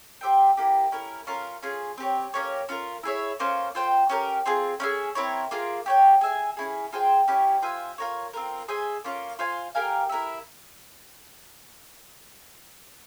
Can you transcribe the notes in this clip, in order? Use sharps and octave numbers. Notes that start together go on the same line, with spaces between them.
G4 C5 E5 G5
A#3 E4 G4
C#4 E4 A#4
C#4 F4 A#4 F5
C#4 F4 G#4
C4 G4 C#5
A#3 C#4 G4 C#5
C#4 F4 A#4
E4 G#4 C#5 E5
A#3 C#4 F4 C5
F4 C5 G5
C#4 G4 A#4
C4 F4 G#4
C#4 E4 G#4 E5
C4 E4 A#4 C#5
A#3 F4 G#4
G4 C#5 G5
G#4 E5 G#5
C#4 E4 G#4
F4 G#4 C5 G5
C#4 E4 G4 C#5
F4 C5 E5 G#5
F4 A#4 C#5
C4 F4 A#4
G#4 C5 E5 G#5
A#3 C#4 F4
F4 C5 F5 G#5
G4 A#4 F5 G#5
E4 A#4 E5